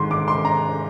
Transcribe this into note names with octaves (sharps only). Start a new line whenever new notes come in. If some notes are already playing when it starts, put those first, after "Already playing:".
Already playing: G#2 D#3 G#3 C6
D6
C6
A#5